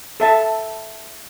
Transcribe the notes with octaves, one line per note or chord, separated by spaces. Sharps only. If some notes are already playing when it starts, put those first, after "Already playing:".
A4 E5 A5